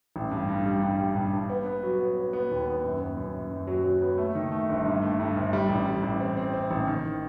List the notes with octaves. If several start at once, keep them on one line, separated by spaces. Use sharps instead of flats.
A1
G2
G2
G3
G2
G3
G2
G2
B3
B3
F#3
B3
B3
B3
D#2
B3
F#2
B3
F#2
F#2
F#2
F#3
F#3
B3
A3
D#3
A3
G1
G2
A3
G2
G1
G3
A1
G3
A1
C4
C4
C4
A1
D#3